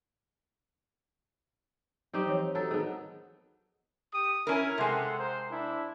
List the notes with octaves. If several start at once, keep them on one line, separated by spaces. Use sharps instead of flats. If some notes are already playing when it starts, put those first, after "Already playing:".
F#3 C4 D#4 G4
E3 F3 C#5
F#3 D#4 A4
D#3 B3 G#4
G4 D#6
C#4 E4 A#4
C3 G#3 A4 F#5
A#4 C5
D4 E4